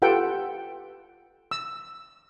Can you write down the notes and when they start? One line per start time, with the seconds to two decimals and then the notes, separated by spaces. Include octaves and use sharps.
0.02 F4 G4 A4 B4 F#5 G5
1.51 E6